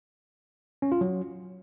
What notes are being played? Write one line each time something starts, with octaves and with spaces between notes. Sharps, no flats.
C#4
F4
F#3